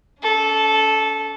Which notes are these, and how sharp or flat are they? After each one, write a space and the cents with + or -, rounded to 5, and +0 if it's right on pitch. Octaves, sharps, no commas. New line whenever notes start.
C#4 +40 A4 -15